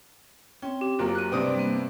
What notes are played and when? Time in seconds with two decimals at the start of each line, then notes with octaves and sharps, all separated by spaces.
0.62 C4 C#4 G5
0.81 G4
0.99 F#1 F#3 A#3 F4
1.15 F#6 D#7
1.32 G2 C3 C4 D4 B4 D5 D#6
1.55 G3 A#3 B3